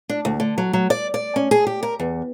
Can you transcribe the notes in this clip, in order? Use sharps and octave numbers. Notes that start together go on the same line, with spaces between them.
D4
D2
D3
F#3
F#3
D5
D5
C#4
G#4
G4
A#4
E2